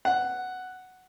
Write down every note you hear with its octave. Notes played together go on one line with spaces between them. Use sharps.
F#5